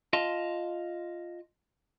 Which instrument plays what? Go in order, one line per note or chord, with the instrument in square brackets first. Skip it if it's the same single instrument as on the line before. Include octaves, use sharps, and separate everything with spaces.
[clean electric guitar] F4 D#5 F5 A5 C6